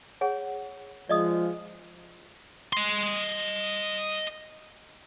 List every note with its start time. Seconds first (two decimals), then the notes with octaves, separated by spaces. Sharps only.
0.21 G#4 C#5 F#5
1.09 F3 G#3 D5 D#5 D#6
2.73 D#5 C6